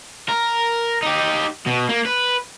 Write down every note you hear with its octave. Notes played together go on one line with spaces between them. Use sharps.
A#4
D#4 G4
B2
A#3
B4